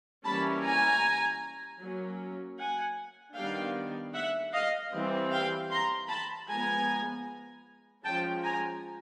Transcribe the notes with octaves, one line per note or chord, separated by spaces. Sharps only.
E3 G3 A#3 C#4 A5 B5
G#5 A#5
F#3 A#3 C#4
F#5 G#5
D#3 G3 B3 D4 F5 G5
E5 F#5
D#5 F5
E3 G3 C4
F5 G5
A#5 C6
A5 B5
F3 G#3 B3 G#5 A#5
F3 G#3 C#4 G5 A5
G#5 A#5